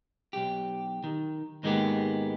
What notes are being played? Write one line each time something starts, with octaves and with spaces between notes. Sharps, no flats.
B1 G4
D#3
G#2 D#3 G#3 A#3 B3 G4